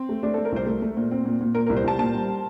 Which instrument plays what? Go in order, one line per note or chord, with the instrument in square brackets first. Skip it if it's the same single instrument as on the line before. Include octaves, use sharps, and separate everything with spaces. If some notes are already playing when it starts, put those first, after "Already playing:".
Already playing: [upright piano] C4
[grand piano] A3
[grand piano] A3 [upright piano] D4
[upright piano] A4
[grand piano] A3
[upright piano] A#4
[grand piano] C2 [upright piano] C5
[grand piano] A3 [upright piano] A#4
[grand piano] A3
A#2
C4
A#2
A#2
[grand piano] A#2 [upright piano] A#4
[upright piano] A#4
[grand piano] C2
[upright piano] C5
[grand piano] C2 [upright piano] A5
[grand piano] A#2 [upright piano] A5
[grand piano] G3